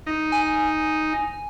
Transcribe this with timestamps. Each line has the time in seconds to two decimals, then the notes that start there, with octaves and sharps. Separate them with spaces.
0.07 D#4
0.32 G#5